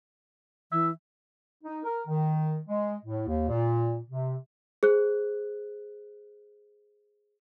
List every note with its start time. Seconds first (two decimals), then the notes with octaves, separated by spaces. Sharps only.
0.72 E3 E5
1.64 D#4
1.84 A#4
2.07 D#3
2.67 G#3
3.05 A2
3.27 D#2
3.49 A#2
4.09 C3
4.83 G#4 C5 F#6